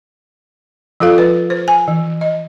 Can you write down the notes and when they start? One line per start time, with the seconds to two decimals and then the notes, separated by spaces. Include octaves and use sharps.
1.00 F3 F4 A4 F5
1.18 B4
1.50 C5
1.68 G#5
1.88 E3
2.21 D#5